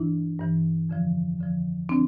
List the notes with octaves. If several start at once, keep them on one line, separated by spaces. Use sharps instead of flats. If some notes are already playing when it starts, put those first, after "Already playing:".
Already playing: G2 E3 D4 E4
G2 E3
F2 D3 F3
F2 D3 F3
D3 F3 C4 D4